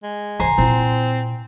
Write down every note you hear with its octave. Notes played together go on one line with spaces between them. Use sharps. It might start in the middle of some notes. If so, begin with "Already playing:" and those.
G#3
C#3 E3 C5 G#5 A#5
A#2 C4 E4